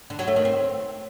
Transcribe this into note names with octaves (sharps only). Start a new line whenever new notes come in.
D3
F#3
A3
D#3
C4